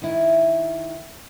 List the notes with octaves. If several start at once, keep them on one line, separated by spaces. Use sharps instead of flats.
D#3 E4